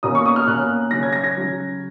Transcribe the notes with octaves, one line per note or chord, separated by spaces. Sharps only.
B2 A#3 C#4 D#6
C#6
D#6
F6
B2 A#3 C#4 F#6
C#3 F#3 C#4 A#6
G#6
A#6
A#6
C#3 F#3 C#4